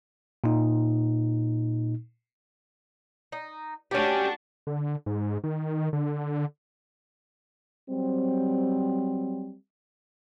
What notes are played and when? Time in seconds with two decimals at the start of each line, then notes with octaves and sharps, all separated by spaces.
0.44 A#2 D#4
3.32 D#4
3.91 A3 C#4 D4 F#4 G4
4.67 D3
5.06 G#2
5.44 D#3
5.93 D3
7.89 F#3 G3 C4